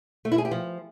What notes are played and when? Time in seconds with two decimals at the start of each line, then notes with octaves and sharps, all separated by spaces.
0.25 A3
0.32 E4
0.38 G#4
0.45 G4
0.51 F3